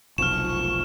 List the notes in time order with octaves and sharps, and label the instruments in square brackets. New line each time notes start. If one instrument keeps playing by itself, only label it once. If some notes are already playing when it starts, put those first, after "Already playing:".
[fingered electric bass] F1 B1 [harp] F2 [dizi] C#6 [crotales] F6 E7